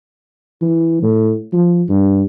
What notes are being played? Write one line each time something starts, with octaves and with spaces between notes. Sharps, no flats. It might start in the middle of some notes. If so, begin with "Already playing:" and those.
E3
A2
F3
G2